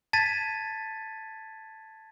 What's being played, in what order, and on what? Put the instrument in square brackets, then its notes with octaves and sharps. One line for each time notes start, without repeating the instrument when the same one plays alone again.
[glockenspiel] A5 G#6 A6 B6 D#7